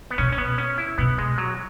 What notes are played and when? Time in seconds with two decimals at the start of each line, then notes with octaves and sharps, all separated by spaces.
0.11 B3
0.18 B2 C#4
0.33 C#4
0.38 B3
0.58 C#4
0.78 E4
0.98 B2 B3
1.18 G#3
1.38 F#3